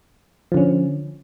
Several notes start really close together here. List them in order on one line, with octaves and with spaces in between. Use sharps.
F3 D3 C#4